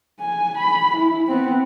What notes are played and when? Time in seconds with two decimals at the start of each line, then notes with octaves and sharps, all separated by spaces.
0.20 G#5
0.58 B5
0.96 E4
1.28 B3 C4